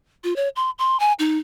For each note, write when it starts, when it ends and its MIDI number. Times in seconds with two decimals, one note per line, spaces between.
0.24 0.36 65
0.36 0.49 73
0.56 0.70 84
0.79 0.99 84
1.00 1.13 80
1.19 1.38 63